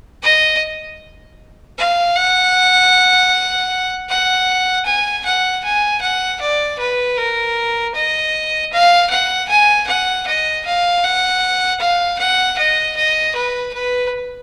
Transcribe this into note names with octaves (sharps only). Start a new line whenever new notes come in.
D#5
F5
F#5
F#5
G#5
F#5
G#5
F#5
D5
B4
A#4
D#5
F5
F#5
G#5
F#5
D#5
F5
F#5
F5
F#5
D#5
D#5
B4
B4